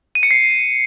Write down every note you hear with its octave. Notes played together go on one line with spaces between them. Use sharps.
D#7
C#7
C7